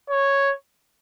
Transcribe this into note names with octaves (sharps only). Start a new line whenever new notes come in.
C#5